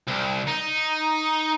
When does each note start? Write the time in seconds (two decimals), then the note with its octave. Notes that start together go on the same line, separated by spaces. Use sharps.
0.07 C2
0.47 D#4